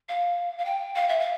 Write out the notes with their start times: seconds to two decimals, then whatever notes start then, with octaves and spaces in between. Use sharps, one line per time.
0.09 F5
0.58 F5
0.65 G5
0.95 F5
1.09 E5
1.20 F5